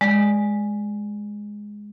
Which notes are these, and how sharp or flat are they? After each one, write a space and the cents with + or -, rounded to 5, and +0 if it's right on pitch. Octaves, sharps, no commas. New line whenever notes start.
G#3 +0 D5 +0